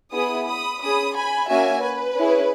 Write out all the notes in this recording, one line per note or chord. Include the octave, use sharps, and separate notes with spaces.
B3 E4 G#4 B5 D#6
B5 D#6
C#4 G#4 B5 D#6
G#5 B5
A#3 C#4 F#4 E5 G#5
B4
C#4 E4 G#4